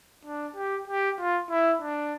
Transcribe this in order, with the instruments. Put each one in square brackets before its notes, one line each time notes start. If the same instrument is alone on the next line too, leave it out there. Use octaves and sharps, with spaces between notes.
[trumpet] D4
G4
G4
F4
E4
D4